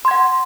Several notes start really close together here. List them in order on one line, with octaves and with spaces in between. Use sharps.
C6 G#6 F#5